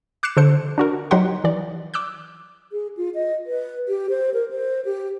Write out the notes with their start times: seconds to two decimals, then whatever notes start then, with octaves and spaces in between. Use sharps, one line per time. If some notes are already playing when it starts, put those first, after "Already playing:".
0.23 D6 F#6 C7 C#7 E7
0.37 D3 A4 C5 C#7
0.78 D4 F#4 A#4
1.11 F#3 D#4 G4 F#5 C6
1.44 E3 D5
1.94 D6 E6 F#6 G6
2.72 G#4
2.97 F4
3.15 D#5
3.46 B4
3.88 G4
4.10 C5
4.34 A#4
4.51 C5
4.85 G4